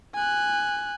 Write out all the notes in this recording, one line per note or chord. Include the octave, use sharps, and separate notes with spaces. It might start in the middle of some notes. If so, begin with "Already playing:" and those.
G#5 F#6